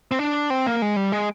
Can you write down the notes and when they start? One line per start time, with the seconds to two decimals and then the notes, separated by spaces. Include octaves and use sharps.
0.11 C4
0.19 D4
0.50 C4
0.66 A#3
0.82 G#3
0.97 G3
1.12 G#3